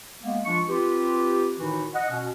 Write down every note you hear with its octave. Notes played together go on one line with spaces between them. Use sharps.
G#3 A#3 B3
F3 G#3 D4 F4 C#6
C4 F4 G4 B4
A2 D#3 E3 D#4 E4 F#4
D#5 F#5
B2 C#4